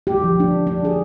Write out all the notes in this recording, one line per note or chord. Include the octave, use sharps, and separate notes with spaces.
G4
F3
D4
D4
G#4